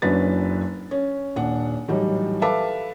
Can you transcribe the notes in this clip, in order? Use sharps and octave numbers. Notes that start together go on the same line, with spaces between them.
F#1 F#2 F#3 D4 B4 A6
C#4
D#1 D4 F#5
A2 E3 F#3 G3 D#4
A4 B4 E5 F5 A5 D6